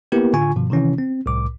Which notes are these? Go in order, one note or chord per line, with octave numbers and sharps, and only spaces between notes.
A#3 B3 E4 G4 A#4 B4
A2 D3 F4 G#5 C#6
G2 B2 D#3 F3
C3 D#3 E3 C#4 E4
C4
C2 A2 D6